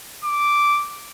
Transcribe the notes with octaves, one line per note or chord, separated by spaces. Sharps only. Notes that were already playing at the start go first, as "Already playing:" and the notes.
D6